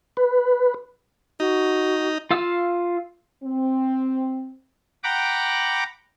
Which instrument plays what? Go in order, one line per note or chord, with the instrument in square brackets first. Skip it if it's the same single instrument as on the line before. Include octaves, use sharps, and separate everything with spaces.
[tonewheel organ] B4
[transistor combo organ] D#4 [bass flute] F#4
[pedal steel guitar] F4 F5 E6
[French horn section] C4
[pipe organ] F#5 G5 A#5 B5 D6